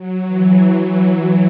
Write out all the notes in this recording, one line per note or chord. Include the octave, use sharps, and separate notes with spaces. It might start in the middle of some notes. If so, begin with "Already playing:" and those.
Already playing: F#3
E3